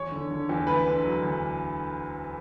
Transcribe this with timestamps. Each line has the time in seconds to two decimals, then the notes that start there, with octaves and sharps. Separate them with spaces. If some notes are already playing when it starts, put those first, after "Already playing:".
Already playing: E2 C#5
0.12 D3
0.31 D3
0.49 E2
0.67 D2 B4
0.86 D3
1.03 F#3
1.22 D2